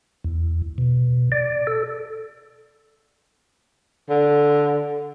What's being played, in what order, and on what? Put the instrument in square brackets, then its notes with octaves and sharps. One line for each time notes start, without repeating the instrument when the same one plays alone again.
[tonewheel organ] E2
B2
D5
A4
[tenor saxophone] D3